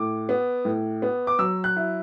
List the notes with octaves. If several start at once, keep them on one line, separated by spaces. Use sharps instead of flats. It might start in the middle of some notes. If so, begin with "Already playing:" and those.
Already playing: A2 D6
B3
A2
B3
D6
F#3 E6
F#6
E4